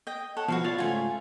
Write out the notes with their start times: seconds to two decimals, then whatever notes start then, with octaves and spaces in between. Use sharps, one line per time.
0.07 D#5 G5
0.37 A4 C#5 F#5
0.48 C2 B2 F3 F#4 B4 F5
0.64 F4 C#5 D5
0.78 G#2 C#3 A3 F4 G#5